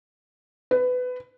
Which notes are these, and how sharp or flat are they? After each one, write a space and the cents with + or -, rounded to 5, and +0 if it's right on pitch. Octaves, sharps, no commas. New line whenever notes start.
B4 +20